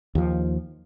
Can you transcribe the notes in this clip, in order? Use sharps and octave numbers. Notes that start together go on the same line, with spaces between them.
D#2 F3